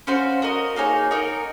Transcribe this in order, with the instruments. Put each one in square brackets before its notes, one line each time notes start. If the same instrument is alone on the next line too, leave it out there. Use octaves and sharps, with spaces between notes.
[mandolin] C#4 F#4 C5 F5
F#4 A#4 D#5
A#3 D#4 G#4 C#5
D#4 F#4 A#4 D#5